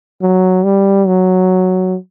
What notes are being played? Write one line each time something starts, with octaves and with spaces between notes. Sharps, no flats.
F#3
G3
F#3